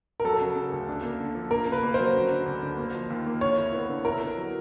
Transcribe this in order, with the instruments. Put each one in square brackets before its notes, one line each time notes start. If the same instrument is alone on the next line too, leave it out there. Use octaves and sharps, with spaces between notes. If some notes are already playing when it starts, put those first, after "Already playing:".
[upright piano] A#4
[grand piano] F#3 [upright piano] A4
[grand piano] C#3
C#3
D2
D4
A#3
D3
F3
[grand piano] A#3 [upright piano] A#4
[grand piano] C#3
[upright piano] B4
[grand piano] A#3
[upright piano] C5
[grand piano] F#3
D3
D3
D2
D3
A#3
F3
D#2
A#3
[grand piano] D3 [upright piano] C#5
[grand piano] E4
B3
D3
[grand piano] E4 [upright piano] A#4
[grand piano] B3
F#3